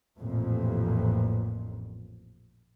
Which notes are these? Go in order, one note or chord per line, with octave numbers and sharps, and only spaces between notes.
A1 F2 A#2